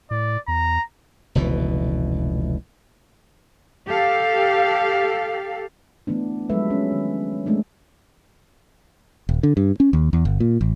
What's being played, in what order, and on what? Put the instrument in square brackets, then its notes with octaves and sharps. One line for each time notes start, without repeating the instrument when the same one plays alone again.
[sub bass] A2 [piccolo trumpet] D5
[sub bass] E2 [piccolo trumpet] A#5
[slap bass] F1 C#2 B2 E3
[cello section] G4 A4 F5
[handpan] E3 A3 B3 D4
F3 F#3 G#3 A4 B4 E5
C#4
D#3
G#3 A3 C4 D4
[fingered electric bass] D#1
D3
G2
C#4
D#2
E2
G1
A#2
A1